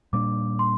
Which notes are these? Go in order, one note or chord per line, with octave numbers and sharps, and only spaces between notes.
A#2 G3 A#3 D4 D6
C6